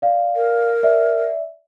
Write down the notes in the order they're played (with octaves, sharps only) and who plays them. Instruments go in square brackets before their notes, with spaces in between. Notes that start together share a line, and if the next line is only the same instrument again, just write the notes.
[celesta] D5 F5
[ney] A#4
[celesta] D5 E5